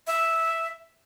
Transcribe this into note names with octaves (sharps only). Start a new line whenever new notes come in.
E5